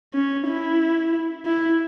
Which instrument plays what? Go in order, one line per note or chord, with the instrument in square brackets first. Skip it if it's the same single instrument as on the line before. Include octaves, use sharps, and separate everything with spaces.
[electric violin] C#4
E4
E4